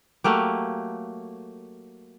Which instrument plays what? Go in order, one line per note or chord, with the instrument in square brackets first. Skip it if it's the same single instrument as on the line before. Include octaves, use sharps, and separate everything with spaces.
[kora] F#3 A3 A#3 G4